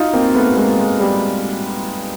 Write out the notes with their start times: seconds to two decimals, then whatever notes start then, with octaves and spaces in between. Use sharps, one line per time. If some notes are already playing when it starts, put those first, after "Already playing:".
Already playing: D#4 F4
0.13 A#3 C4
0.35 A3 B3
0.56 G#3 A#3
0.79 G#3
1.00 G3